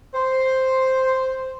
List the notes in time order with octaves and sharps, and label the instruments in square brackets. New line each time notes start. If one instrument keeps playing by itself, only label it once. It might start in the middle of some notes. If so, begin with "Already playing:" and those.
[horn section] C5